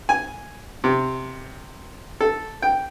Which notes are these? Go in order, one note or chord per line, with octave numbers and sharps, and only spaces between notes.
G#5
C3
A4
G5